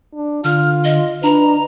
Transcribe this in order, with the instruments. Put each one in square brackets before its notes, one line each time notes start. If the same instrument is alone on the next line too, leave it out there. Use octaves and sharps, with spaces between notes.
[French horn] D4
[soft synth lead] D3 [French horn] F4 [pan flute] F6
[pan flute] D#5
[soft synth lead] D4 [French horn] B4 [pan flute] A#5